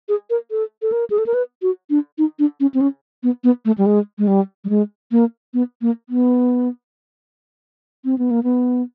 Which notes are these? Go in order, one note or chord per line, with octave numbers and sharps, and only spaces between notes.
G#4
A#4
A4
A4
A#4
G#4
A4
A#4
B4
F#4
D4
D#4
D4
C#4
C4
C#4
B3
B3
A3
G3
G#3
G#3
G3
G3
G#3
A#3
B3
A#3
B3
C4
B3
A#3
B3